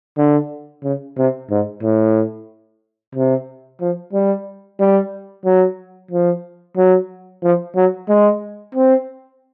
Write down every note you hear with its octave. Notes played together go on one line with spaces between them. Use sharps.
D3
C#3
C3
G#2
A2
C3
F3
G3
G3
F#3
F3
F#3
F3
F#3
G#3
C4